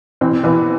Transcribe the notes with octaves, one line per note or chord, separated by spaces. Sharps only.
E3 C4
E3 B3